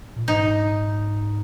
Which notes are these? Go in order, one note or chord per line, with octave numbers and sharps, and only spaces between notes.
A#2
G#2 D#4